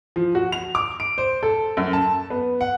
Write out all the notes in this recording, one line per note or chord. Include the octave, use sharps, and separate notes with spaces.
F3
F#4
F7
D6
D7
C5
A4
F#2
A5
B3
F#5